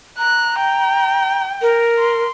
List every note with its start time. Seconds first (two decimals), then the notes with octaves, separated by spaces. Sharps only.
0.18 A#5 F#6
0.59 G5
1.62 A#4
1.99 C6